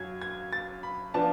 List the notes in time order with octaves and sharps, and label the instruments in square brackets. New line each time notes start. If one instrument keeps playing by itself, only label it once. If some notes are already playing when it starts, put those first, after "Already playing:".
Already playing: [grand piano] F#2 F#3 G#6
G#6
A6
B5
F3 B3 D4 A5